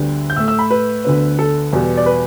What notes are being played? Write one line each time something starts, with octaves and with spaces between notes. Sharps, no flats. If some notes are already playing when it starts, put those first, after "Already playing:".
Already playing: D2 D3 G3 B3
G6
A2 A3 E6
E6
B5
B4
D2 D3 B3
A4
E2 B2 G3 B3
D5
B4